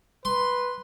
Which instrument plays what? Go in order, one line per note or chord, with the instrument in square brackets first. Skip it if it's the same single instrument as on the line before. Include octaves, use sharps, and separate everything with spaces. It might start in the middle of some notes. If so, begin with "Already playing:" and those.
[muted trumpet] B4 [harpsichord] C6